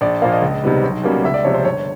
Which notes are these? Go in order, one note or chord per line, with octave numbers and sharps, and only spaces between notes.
A#1 D5
A#2 F3 A#3 F5
D#5
C#2
C3 D#3 G3 B3
B1
B2 G3 A#3 C#4
C#2 E5
D5
C3 F3 C#5
C5
G1 C#5